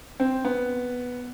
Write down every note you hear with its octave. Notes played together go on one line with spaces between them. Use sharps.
C4
B3